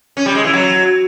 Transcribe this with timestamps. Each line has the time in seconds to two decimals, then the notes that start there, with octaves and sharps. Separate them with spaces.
0.17 C#4
0.26 G3
0.35 G#3
0.44 E3
0.53 F#3